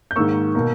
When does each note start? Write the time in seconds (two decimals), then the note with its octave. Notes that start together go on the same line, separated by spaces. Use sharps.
0.11 G6
0.16 G#2 D#3 A#3 C#6 E6
0.55 B2 A#3